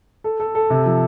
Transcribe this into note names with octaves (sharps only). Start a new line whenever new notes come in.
A4
A4
A4
C3
F3